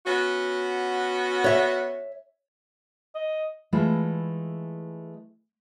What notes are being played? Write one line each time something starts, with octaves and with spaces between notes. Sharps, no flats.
B3 C#4 F#4
C#5 E5
D#5
E3 G#3 A3 E4 F4